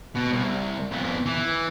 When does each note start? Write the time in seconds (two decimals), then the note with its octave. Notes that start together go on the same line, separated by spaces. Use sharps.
0.15 B2
0.32 C2
0.91 F2 B3
1.26 E3 E4